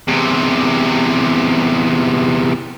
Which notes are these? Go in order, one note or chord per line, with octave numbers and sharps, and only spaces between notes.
E2 C3